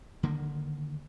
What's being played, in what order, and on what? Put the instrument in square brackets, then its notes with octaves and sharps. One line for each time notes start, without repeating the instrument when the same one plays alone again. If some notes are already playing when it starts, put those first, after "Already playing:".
[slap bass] D3 D#3 A#3